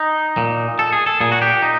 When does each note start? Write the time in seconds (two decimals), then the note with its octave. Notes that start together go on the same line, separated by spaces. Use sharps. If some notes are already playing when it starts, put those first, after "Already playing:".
Already playing: D#4
0.37 A#2
0.79 A4
0.93 G#4
1.06 A4
1.21 A#2 G#4
1.32 F#4
1.42 G4
1.62 D#4